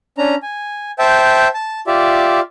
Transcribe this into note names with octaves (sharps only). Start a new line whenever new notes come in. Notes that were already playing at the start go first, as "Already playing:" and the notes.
C#4 D4 A#5
G#5
C5 E5 G5 A5
A5
F4 G4 D5 E5